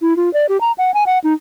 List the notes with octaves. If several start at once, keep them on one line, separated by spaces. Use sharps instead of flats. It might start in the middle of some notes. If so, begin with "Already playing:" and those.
E4
F4
D5
G4
A#5
F#5
G#5
F#5
D#4